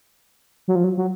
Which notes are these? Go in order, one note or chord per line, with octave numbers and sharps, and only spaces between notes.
F#3
F3
F#3
F#3